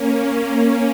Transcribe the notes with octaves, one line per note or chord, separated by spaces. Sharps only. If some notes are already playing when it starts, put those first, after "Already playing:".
Already playing: A#3 C#4